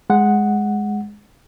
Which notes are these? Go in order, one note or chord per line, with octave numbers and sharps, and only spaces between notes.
G#3 F#5